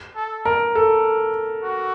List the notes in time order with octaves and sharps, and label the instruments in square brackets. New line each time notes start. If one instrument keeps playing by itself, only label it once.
[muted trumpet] A4
[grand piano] A#4
A4
[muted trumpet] F#4